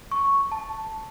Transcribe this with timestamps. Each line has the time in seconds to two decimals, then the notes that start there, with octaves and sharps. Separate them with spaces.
0.12 C#6
0.52 A5